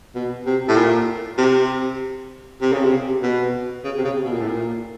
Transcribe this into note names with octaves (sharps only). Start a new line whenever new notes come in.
B2
C3
A2
A#2
C3
C3
C#3
C3
B2
C#3
C3
C#3
B2
A#2
A2
A#2